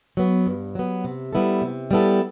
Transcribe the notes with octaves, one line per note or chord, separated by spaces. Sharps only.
F#3 B3
G2
F#3 B3
C3
G3 B3 E4 A4
C3
G3 B3 E4 A4